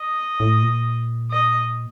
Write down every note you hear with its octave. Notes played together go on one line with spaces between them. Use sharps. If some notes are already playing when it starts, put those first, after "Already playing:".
Already playing: D#5
A2
A#2
D#5